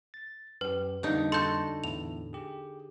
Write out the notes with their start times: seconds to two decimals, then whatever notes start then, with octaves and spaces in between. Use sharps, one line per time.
0.14 A6
0.61 F#2 G4 B4
1.03 F2 D3 G3 A#3 D#4
1.32 F#4 A4 C6 G6
1.84 E2 A2 F7
2.33 G4 G#4